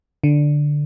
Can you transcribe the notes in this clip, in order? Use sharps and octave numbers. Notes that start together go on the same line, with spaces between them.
D3